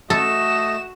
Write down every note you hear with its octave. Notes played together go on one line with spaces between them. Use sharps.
A3 F#4 A4 D#5 E7